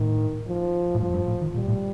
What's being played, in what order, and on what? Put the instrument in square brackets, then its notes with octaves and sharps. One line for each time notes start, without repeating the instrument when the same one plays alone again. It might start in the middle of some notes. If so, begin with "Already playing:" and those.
Already playing: [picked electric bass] A2 [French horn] D#3
[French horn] F3
[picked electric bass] A2
[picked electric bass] G2 [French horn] F3
[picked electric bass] F2
G2
A2
D#3
[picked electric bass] A#2 [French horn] G3
[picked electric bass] A2